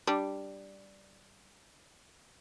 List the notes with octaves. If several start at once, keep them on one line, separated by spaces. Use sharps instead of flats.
G3 D4